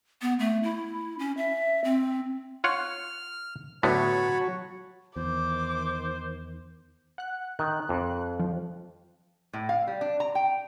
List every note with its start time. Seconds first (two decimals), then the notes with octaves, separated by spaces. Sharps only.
0.22 B3
0.39 A3
0.63 E4
1.19 C#4
1.37 E5
1.84 C4
2.64 F4 C#5 F#5 F6
3.83 A2 D3 F#3 B3 F#4 C#5 A5 B5
5.16 E2 D#3 C5 D6
7.18 F#5 F#6
7.59 D#3 F#6
7.89 F2
8.39 F3
9.54 A2
9.69 F5
9.87 G3
10.01 D4
10.20 A#5
10.35 G5